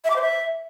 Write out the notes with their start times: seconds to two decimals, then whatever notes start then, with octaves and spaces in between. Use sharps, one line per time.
0.04 E5
0.10 D6
0.16 C5
0.22 E5